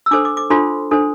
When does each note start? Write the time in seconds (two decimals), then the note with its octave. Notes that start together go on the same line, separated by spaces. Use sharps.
0.06 E6
0.11 D4 A4 C5 D6
0.25 D6
0.37 D6
0.50 D4 F4 A4 C5 C6
0.91 D4 A4 C5